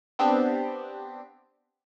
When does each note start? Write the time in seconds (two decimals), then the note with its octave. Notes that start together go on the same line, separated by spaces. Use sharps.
0.19 B3 C4 D4 G4